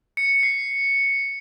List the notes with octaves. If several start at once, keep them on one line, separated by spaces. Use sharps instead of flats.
C#7
C7